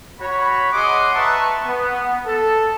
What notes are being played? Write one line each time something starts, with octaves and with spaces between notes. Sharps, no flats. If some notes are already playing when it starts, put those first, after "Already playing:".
F#4 C#5 B5
G#4 D#5 F#5 C6 D6 D#6
B4 E5 A5 A#5 C#6
B3
A4